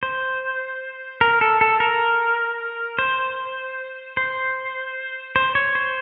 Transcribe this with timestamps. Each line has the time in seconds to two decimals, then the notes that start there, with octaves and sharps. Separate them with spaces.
0.03 C5
1.21 A#4
1.41 A4
1.61 A4
1.80 A#4
2.99 C5
4.17 C5
5.36 C5
5.55 C#5
5.75 C5